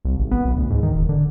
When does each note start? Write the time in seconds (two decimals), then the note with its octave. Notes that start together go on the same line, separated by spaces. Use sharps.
0.05 C2
0.19 G#1
0.31 B3
0.45 B1
0.56 D2
0.70 G#2
0.83 D#3
0.94 E1
1.09 D3